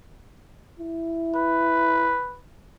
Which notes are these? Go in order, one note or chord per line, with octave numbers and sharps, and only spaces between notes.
E4
B4